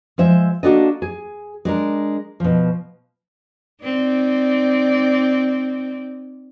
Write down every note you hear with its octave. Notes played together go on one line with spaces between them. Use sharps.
F3 G#3 C5 E5
A#3 C4 D4 F#4 A4 D#5
G#4
G#3 D4 A#4
B2 F3
C4 D#4 D5